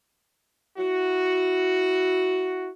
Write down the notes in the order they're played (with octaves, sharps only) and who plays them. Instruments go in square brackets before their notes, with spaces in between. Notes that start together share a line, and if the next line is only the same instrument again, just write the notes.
[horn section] E4 F#4